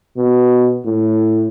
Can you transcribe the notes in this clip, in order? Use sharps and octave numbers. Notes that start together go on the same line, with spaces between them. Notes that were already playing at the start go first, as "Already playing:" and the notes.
B2
A2